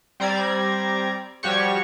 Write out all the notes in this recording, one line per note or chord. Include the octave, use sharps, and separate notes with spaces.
G3 C4 D5 A#5 G#6
F3 G3 F#4 G4 C#5 C#6